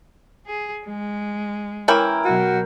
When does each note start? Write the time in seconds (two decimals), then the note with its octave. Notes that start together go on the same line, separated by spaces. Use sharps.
0.46 G#4
0.86 G#3
1.88 E3 C#4 E4 A#4 G5
2.25 B2 F#3 F#4